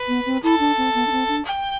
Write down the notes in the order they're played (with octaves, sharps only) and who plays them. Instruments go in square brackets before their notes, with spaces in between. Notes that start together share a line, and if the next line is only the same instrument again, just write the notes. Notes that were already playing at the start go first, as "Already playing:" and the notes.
Already playing: [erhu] B4
[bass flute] B3
C4
[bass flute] E4 [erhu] A4
[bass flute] D4
C4
B3
D4
C4
D4
[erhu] G5